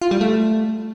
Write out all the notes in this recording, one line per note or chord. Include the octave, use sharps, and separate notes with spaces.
F4
G3
A3